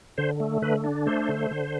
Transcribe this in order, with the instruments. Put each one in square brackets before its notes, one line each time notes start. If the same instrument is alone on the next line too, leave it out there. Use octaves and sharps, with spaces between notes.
[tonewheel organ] D3 C5
A3
D3 B4
D4
A3 C5
D3
D3